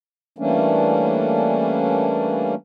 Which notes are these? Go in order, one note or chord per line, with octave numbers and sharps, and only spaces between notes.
E3 G3 A3 A#3 C#4 D4